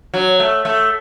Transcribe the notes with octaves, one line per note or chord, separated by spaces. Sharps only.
F#3
A3
A3